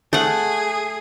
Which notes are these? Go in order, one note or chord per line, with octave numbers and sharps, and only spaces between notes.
A3 G#4 F#5